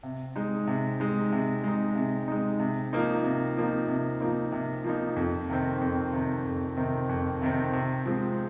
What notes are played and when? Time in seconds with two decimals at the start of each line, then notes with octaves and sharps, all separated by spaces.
0.03 C3
0.36 G#3 D#4
0.67 C3
1.00 G#3 D#4
1.32 C3
1.64 G#3 D#4
1.95 C3
2.28 G#3 D#4
2.60 C3
2.93 F3 A#3 D#4
3.24 C3
3.57 F3 A#3 D#4
3.88 C3
4.21 F3 A#3 D#4
4.52 C3
4.84 F3 A#3 D#4
5.16 F2
5.49 C3 D#3 C4
5.81 F2
6.13 C3 D#3 C4
6.45 F2
6.77 C3 D#3 C4
7.09 F2
7.42 C3 D#3 C4
7.73 C3
8.05 F3 G#3 C4